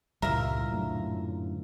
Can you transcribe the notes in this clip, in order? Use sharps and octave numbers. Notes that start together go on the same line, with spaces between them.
C#2 G2 A#2 E3 G3 A#4 E5
F#2 A2 D3